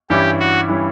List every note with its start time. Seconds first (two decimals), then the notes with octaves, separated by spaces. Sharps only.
0.10 G2 E3 G3 C#4 E4 G4
0.39 F#4
0.68 E3 G3 C#4 E4